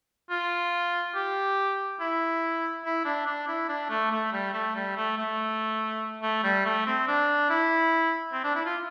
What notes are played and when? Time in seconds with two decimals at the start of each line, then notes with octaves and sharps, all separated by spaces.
0.30 F4
1.15 G4
2.00 E4
2.85 E4
3.05 D4
3.26 D4
3.47 E4
3.69 D4
3.90 A3
4.11 A3
4.33 G3
4.53 A3
4.75 G3
4.96 A3
5.17 A3
6.22 A3
6.44 G3
6.65 A3
6.86 C4
7.08 D4
7.50 E4
8.32 C4
8.44 D4
8.55 E4
8.65 F4